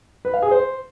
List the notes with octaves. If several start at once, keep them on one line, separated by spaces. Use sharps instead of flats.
B4
F5
G#4
C5